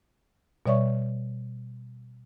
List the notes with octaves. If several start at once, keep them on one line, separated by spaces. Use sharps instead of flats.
B2 G3 C#5 D5 E5 C#6